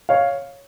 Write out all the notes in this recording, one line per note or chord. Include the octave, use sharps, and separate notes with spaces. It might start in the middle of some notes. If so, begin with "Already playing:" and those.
C#5 F5